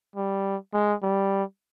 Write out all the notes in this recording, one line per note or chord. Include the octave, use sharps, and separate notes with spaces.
G3
G#3
G3